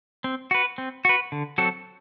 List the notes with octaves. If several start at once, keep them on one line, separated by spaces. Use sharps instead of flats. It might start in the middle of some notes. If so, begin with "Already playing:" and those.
C4
F#4 B4
C4
F#4 B4
D3
F#3 C4 F#4 A4